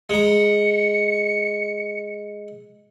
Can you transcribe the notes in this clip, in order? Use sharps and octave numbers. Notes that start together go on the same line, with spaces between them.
G#3 A#5 C#7